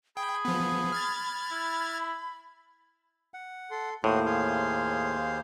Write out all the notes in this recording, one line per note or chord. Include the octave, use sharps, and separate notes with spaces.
G#4 G5 B5
F3 B3
F6 G#6 A6
E4
F#5
A4 C6
D#2 A2 A#3 F#4 C5 C6 D#6
G#4 F5 C6